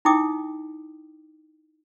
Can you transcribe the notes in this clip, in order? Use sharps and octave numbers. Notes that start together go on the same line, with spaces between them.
D#4 E4 G5 D6 D#6